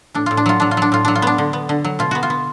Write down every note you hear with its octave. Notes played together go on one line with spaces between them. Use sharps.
A2 D4
A2 F4
D4
F#3 F4
F#3 D4
F4
F#3 D4
A2 F4
F#3 D4
F4
B3 D4
D3
B3
D3
F#3
B2 F4
B3 F#4
F4
B3